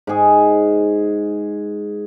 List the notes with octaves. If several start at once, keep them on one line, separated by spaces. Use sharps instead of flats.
G#2 G#4